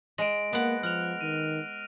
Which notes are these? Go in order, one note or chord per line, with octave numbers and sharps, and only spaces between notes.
G#3 A#6 D7
A#3 B3 F#5
F3 F#5 F6 F#6 F7
D#3 D#7